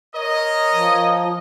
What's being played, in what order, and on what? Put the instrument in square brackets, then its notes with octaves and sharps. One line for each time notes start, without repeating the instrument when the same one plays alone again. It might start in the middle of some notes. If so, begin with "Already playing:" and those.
[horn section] A#4 C#5 D#5
[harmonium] F3